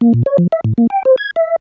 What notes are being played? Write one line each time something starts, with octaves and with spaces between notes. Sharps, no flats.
A#3
A#2
C#5
F3
E5
A2
A#3
G5
C5
G#6
E5